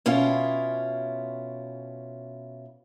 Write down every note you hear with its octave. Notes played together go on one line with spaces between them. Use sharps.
B2 C#4 E4 F4